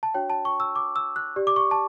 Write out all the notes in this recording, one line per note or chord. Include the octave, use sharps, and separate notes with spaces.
A5
D4 F#4 C#5 G5
A5
C#6
E6
D6
E6
F#6
G4 D5
D6
C#6
A5